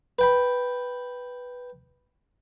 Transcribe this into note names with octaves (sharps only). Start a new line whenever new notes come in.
B4 G5 B5